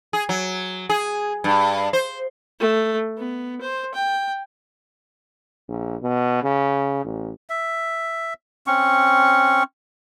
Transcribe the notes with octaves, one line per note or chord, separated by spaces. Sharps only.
G#4
F#3
G#4
G2
C5
A3
B3
C5
G5
A#1
B2
C#3
A1
E5
C4 C#4 C#6